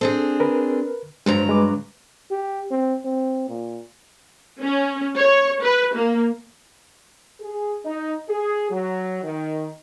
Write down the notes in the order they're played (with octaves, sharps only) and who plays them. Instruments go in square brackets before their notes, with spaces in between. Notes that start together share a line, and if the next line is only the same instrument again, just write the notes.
[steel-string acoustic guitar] C4 D4 G#4 [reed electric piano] A4
[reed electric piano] A#4 B4
[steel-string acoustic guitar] G2 F#3 A#5 [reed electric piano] G#3 C5
[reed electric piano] G#3 B4 D6
[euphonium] G4
C4
C4
A#2
[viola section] C#4
C#5
B4
A#3
[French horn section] G#4
D#4
G#4
F#3
D#3